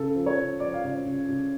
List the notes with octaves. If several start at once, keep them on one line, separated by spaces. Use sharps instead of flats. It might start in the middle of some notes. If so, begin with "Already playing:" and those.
Already playing: C#3 A4
F3
C#5
C#3
F3 D5
F5
C#3 D5
C#3
C#3